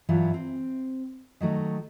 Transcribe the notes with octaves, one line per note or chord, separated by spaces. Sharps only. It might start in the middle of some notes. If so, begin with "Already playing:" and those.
G2 E3 F#3 E4 F4
C4
D#3 F#3 A3 D#4